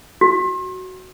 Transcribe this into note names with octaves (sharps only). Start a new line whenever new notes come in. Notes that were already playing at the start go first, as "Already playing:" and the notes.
F#4